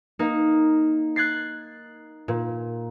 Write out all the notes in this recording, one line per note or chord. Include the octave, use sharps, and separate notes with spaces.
A#3 D#4
F#6 G#6 A6 C7
A#2